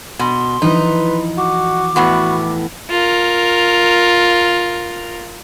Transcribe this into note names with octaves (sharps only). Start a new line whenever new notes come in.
B2 C6
E3 F3 D#4 E4 B4
F#4 D6
E2 A2 B3 F#4
F4 A#4